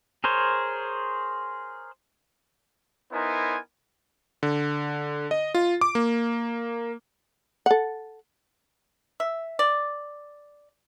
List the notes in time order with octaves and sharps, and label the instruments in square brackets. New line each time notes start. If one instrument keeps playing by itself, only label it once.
[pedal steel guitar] G#4 A#4 C5 C#5
[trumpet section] B3 D#4 E4 A#4 C5 G#5
[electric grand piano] D3
D#5
F4
D6
A#3
[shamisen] A4 F#5
[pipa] E5
D5